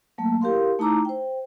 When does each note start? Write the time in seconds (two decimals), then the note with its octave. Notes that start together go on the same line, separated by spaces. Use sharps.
0.18 F#3 A3 A#3
0.41 E4 G4 A#4 F5 C6
0.79 A3 D#4 E4 A#5 D6 E6
1.05 C5 G5